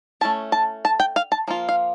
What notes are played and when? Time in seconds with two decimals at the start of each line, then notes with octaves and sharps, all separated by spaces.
0.21 A3 C#4 E4 A5
0.52 A5
0.85 A5
1.00 G5
1.16 F5
1.32 A5
1.48 F3 A#3 F4
1.69 F5